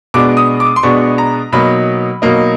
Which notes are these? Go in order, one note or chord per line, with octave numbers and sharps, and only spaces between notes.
B2 G#3 B3 D4 D6
D#6
D6
C6
B2 G#3 B3 D4 C#6
A#5
B2 F#3 A#3 D#4 B5
B2 F#3 A#3 D#4